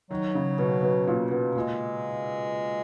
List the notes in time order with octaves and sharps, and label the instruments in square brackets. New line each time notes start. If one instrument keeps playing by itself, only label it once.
[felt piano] D#3 [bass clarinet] F#3
[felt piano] C#3
B2
B2
A#2
B2
[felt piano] A#2 [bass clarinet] G#3